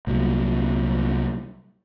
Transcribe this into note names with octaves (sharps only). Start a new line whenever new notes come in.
C2 A#2 F#3 G3